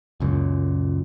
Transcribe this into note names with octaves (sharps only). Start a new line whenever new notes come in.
C#2 F#2 A#2